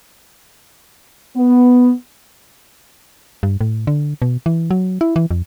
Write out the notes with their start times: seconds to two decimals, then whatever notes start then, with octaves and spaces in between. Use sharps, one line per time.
1.36 B3
3.43 G2
3.61 A2
3.87 D3
4.22 B2
4.46 E3
4.71 F#3
5.01 E4
5.16 E3
5.31 F2